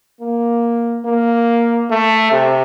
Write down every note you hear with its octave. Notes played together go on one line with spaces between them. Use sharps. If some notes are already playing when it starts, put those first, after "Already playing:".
A#3
A#3
A3
C3